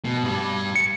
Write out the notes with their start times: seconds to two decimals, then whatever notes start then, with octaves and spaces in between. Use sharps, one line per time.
0.05 B2
0.23 G2 G3
0.76 C#7